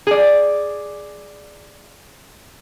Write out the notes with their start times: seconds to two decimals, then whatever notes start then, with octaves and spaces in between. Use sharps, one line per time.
0.07 G#4 D5